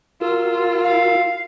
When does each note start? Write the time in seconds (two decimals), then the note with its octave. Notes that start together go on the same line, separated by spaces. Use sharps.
0.21 F4 F#4 A#4 E6
0.84 F5